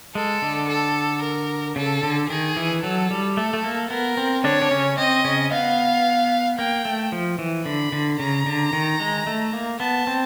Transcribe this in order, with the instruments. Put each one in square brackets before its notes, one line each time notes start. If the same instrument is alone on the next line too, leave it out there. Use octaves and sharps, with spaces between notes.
[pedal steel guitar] G#3 [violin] A4
[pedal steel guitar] D3
[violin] A4
A#4
[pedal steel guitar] C#3 [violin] A4
[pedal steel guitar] D3
[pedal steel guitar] D#3 [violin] G#4
[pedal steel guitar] E3
[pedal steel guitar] F#3 [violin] A4
[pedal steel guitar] G3
[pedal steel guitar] A3 [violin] A4
[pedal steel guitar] A3
A#3
[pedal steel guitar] B3 [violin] A#4
[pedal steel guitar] C4
[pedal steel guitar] D3 D4 [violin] C#5
[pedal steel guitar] D4
C#3 C#4
[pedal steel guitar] C4 [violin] D#5
[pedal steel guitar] C#3 C#4
[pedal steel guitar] B3 [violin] F5
[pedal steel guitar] A#3 [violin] G5
[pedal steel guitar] A3
F3
E3
[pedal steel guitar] D3 [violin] B5
[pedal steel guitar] D3
[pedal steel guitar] C#3 [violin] A#5
[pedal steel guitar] D3
D#3
G#3
A3
A#3
[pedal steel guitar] B3 [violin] A5
[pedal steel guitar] C4